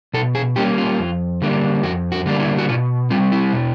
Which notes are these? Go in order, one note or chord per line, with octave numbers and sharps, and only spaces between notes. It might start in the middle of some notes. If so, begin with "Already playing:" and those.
B2 A4
G#4
G3 A#3 C#4 G4
F4
F2
D3 G3 A#3 D4
F2 F#4
F#4
D3 G3 A#3 D4
E4
F#4
B2 F4
G3 C4 F4
E4
B2